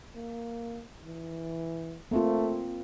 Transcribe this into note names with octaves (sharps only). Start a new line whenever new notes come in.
A#3
E3
A3 A#3 C4 F4